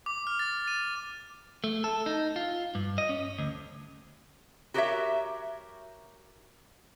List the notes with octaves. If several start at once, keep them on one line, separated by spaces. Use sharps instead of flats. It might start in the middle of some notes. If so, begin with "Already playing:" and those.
D6
F6
A6
D#7
A3
A4
D#4
F4
G2
D#5
C#4
D2
F#4 G4 A#4 B4 C#5 E5